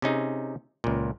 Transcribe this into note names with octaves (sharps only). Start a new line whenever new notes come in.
C3 C#4 D#4 G#4
C#2 A#2